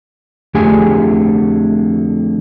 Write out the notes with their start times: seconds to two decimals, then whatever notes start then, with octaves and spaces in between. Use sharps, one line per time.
0.54 F2 D3 A3 G4 G#4 G#5